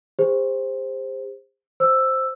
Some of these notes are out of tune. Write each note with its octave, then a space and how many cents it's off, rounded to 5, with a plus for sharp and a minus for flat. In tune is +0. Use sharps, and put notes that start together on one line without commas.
G4 +45 C5 +0
C5 +0 E6 +5